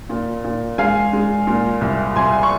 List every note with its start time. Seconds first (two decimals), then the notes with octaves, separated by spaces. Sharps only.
0.10 A#2
0.44 A#2
0.78 G#3 F5 G#5
1.13 G#3
1.47 A#2
1.81 C2
2.16 C2 G#5 C6
2.43 C#6